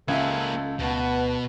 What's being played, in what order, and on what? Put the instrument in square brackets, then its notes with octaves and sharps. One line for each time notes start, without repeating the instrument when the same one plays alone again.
[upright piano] C#2 E5 [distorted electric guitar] A#3 G#4 [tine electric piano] C#4 G#6 [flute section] A4
[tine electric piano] D2 [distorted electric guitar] B2 [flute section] B4 F#5 A5